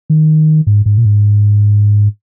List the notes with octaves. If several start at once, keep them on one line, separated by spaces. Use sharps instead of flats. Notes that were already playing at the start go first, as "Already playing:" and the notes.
D#3
G#2
G#2
A#2
G#2